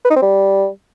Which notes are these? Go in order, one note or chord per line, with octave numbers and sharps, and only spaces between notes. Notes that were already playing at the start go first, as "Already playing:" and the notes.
B4
D#4
C4
G3